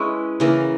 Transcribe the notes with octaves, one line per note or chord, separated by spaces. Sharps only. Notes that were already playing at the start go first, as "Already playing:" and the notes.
Already playing: G#3 C#4 E4 B4
C#3 E3 A#3